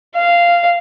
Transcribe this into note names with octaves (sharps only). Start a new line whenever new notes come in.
F5